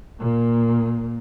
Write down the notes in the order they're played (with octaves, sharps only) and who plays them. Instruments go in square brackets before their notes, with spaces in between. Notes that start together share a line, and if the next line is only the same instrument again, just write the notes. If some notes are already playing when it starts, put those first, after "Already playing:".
[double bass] A#2 A#3